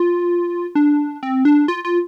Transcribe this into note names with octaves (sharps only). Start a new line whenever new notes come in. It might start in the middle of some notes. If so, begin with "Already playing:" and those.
Already playing: F4
D4
C4
D4
F4
F4